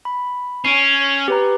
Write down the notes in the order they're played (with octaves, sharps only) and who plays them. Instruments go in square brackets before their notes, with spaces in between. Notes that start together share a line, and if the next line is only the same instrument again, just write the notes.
[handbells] B5
[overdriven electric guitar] C#4 [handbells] C7 D7
[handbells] G4 B4 A#5